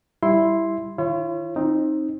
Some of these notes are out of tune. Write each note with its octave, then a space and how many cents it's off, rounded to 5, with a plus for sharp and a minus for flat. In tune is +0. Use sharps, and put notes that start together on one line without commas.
G3 +0 E4 +0 C6 +0
D#3 +5 F4 -45 C#5 -25
C4 +25 D#4 +0